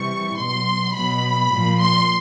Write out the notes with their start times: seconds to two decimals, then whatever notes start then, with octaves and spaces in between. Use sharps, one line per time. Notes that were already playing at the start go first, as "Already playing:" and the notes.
Already playing: C3 E3 G3 C#6
0.37 B2 F#3 C6
0.95 B2 F#3 B5
1.53 A#2 F3
1.81 C6